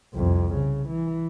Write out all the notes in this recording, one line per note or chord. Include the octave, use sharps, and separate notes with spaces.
C2 F2
C#3
E3